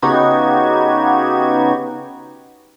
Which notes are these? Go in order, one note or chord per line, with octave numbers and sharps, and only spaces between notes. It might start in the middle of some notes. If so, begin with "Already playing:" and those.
C#3 B3 D#4 F#4 G4 G#6